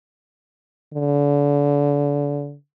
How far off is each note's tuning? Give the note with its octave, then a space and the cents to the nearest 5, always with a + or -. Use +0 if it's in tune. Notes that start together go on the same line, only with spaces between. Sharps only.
D3 -35